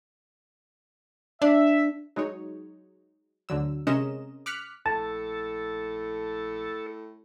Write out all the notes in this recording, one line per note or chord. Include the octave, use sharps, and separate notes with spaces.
D4 E5
F#3 G#3 D#4 C#5
D2 D3 F#3 E6
C3 G#3 C#4 A#4 D#5 E7
D6 F6 F#6 B6 C#7
A#1 A2 A4 A5 A6